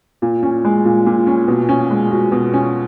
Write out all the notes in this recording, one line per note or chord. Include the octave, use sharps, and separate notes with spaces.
A#2
C#4
G#3
A#2
A#2
C#4
B2
C#4
G#3
F#4
B2
C#4